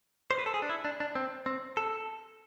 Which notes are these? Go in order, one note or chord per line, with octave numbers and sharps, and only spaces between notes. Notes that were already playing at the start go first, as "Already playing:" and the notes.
C5
B4
A4
G#4
D4
E4
D4
D4
C4
C4
A4